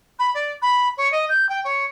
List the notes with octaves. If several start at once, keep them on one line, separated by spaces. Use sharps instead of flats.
B5
D5
B5
C#5
D#5
G6
G5
C#5